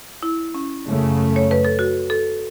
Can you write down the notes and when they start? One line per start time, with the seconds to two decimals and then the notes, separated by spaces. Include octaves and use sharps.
0.23 E4
0.55 C#4
0.85 F#2 C#3 A3
1.36 C#5
1.51 B4
1.65 A4
1.79 F#4
2.10 A4